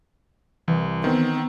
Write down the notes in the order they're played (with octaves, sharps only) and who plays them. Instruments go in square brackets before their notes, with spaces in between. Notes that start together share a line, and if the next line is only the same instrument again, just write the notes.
[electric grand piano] C2 [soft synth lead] E3
[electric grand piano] D#3 C4 [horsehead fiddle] B3